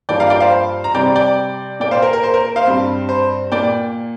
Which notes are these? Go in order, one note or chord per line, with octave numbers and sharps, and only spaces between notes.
G2 F3 A#3 D5 G5
F5 A#5
D5 G5
C5 F5
A#5
C3 G3 C4 D5 G5
D5 G5
A#2 A#3 D5 G5
C5 F5
A#4
A#4
C5
A#4
C5 F5
G2 G3 C4
C5
A#2 A#3 D5 G5